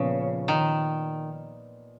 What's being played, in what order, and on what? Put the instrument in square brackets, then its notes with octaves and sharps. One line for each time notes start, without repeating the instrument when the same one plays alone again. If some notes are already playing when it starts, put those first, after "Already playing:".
Already playing: [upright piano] A#2 F3 B3 F4 [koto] C#3
[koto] D#3